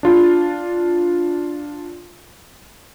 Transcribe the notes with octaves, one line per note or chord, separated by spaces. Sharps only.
D4 F4